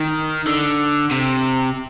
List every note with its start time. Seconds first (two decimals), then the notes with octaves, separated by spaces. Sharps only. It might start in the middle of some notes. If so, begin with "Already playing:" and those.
Already playing: D#3
0.47 D3
1.11 C3